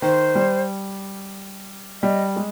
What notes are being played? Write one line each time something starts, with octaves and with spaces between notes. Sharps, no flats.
D#3 C5
G3
G3 D#5
G#3